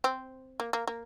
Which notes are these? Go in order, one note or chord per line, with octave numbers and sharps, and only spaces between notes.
C4
A#3
A#3
A#3